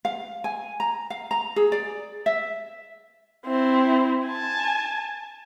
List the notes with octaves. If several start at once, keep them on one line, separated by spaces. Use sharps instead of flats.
F5
G#5
A#5
F5
A#5
G#4
D5
E5
C4 E4
G#5 A5